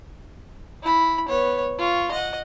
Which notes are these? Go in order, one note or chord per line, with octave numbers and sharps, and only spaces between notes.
E4 B5
B3 C#5
F4 C#6
D#5 F#5